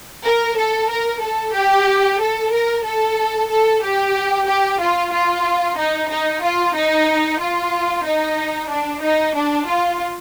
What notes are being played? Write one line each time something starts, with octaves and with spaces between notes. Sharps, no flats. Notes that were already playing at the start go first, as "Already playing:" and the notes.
A#4
A4
A#4
A4
G4
A4
A#4
A4
A4
G4
G4
F4
F4
D#4
D#4
F4
D#4
F4
D#4
D4
D#4
D4
F4